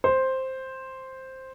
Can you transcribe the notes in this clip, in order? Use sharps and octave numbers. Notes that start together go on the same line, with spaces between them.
C5